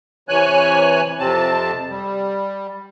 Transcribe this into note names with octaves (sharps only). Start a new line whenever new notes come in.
C3 E3 C#5 G#5 F#6
F2 C3 C4 A5
G3